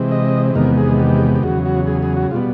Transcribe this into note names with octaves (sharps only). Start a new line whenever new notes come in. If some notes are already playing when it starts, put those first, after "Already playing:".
Already playing: C3 E3 G#3 C4
D#5
E2 C3 D#3 G#3 B3 A#4
G#4
G4
G4
E2 C#3 F#3 F#4
F#4
G#4
G#4
F#4
B2 G3 B3 F4